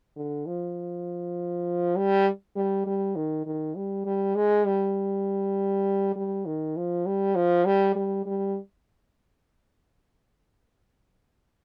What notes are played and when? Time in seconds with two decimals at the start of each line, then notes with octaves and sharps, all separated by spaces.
0.16 D3
0.46 F3
1.96 G3
2.56 G3
2.86 G3
3.16 D#3
3.46 D#3
3.76 G3
4.06 G3
4.36 G#3
4.66 G3
6.16 G3
6.46 D#3
6.77 F3
7.06 G3
7.35 F3
7.65 G3
7.96 G3
8.26 G3